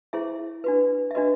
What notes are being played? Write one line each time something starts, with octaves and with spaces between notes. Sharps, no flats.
E4 G#4 C5 E5
D4 F#4 B4
E5
D4 F#4 B4 D#5